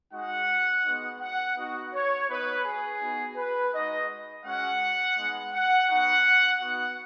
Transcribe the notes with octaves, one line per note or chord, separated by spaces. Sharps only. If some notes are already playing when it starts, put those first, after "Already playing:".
G#3 D#4 F#4 F#5
G#3 B3 D#4 F#4
F#5
B3 D#4 F#4
C#5
B3 D#4 F#4 B4
G#4
B3 D#4 F#4
B4
G#3 D#4 F#4 D#5
G#3 C#4 F#4 F#5
G#3 B3 D#4
F#5
B3 D#4 F#4 F#5
B3 D#4 F#4 F#5